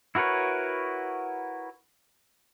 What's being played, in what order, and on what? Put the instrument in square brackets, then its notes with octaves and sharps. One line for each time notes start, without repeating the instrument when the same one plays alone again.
[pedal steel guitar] E4 F#4 A#4 B4 C#5